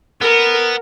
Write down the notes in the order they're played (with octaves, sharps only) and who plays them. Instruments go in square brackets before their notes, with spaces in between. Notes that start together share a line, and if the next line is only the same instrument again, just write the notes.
[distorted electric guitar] B3 [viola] A#4